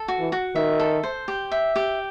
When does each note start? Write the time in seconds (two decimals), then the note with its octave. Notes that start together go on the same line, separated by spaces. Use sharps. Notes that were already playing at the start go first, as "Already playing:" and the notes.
Already playing: A4
0.08 F#4
0.19 E3
0.32 F#4
0.55 D#3 E5
0.80 A4
1.03 C5
1.28 G4
1.51 E5
1.76 G4